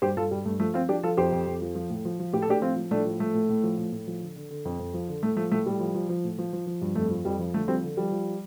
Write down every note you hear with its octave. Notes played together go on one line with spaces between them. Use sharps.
G2 G4 C5
G2 F4 A4
G2 G3
G2 A3
F3 A3
F3 C4 F4
F3 D4 G4
F3 F4 A4
F2 G4 C5
F2
F2
F3
F3
A2
F3
F3
A2 G4
A4
A2 D4 G4
F3 C4 F4
F3
A2 A3 D4
F3
A2 A3
A2
A2
F3
A2
A2
F3
D3
D3
D3
F2
F2
F3
D3
A2 A3
F3 A3
A2 A3
A2 G3
F3
F3
F3
A2
F3
F3
F3
G2
F2 A3
F3
F2 G3
F3
D3 A3
F3 G3 C4
D3
F3 G3
F3